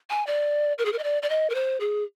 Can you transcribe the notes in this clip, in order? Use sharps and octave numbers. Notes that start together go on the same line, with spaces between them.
G#5
D5
A#4
G#4
A#4
D#5
D5
D5
D#5
A#4
C5
G#4